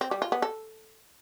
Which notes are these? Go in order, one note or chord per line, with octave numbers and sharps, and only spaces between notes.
C4
G3
F4
B3
A4